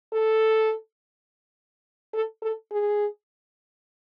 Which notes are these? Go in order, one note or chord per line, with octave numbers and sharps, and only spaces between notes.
A4
A4
A4
G#4